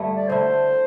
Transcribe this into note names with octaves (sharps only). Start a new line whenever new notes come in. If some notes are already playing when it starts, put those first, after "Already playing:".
Already playing: G2 D3 A3 E4
D5
D3 A3 E4 C5